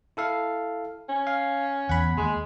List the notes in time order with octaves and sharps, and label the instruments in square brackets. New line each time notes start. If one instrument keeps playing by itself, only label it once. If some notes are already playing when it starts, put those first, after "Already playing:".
[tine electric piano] E4 A4 F5
[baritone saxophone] C#4
[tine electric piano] F5
[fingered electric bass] E2 [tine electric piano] F#5 B5
[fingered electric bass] D#2 [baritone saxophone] G#3